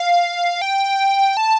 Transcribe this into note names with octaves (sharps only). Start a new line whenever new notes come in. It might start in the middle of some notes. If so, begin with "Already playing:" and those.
Already playing: F5
G5
A5